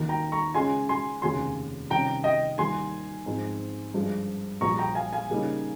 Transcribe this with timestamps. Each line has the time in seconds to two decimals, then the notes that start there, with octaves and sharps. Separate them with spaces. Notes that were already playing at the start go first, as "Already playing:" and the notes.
Already playing: D#2 D#3 A#3
0.09 G5 A#5
0.32 A#5 C#6
0.54 C#3 G#3 C#4 F4 G#5 C6
0.89 G#5 C6
1.22 F1 D#2 C#3 G#5 C6
1.90 C3 D#3 G3 C#4 G5 A#5
2.24 D#5 G5
2.58 D#2 D#3 G3 G#5 C6
3.26 G#2 F3 C4
3.94 G2 F3 G#3
4.61 A#1 A#2 G3 A#5 C#6
4.78 G5 A#5
4.95 F5 G#5
5.13 F5 G#5
5.30 C#3 G3 A#3 D#4